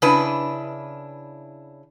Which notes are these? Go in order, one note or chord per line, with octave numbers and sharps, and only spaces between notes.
C#3 D4 E4 B4